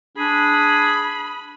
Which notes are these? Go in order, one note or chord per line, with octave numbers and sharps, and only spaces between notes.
D4 G#4 B5